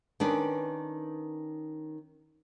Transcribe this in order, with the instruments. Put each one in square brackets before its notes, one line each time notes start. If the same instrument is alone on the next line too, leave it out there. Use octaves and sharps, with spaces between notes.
[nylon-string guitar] D#3 C#4 D4 B4